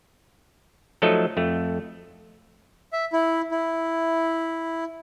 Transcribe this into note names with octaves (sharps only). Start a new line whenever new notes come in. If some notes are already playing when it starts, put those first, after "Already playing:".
F3 F#3 A3 D#4 A4 D#5
F2 A3
E5
E4
E4